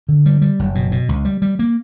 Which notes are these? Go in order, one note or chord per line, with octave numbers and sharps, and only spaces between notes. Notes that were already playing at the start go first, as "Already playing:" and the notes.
D3
G3
G3
F#1
B2
B2
C#2
G3
G3
A#3